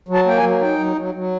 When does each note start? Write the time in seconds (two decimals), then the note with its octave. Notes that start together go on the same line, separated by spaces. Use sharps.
0.08 F#3
0.14 A5
0.26 A#3 G5
0.38 G#5
0.43 F#3
0.61 D#4 G5
0.79 F#3
0.96 F#3
1.14 F#3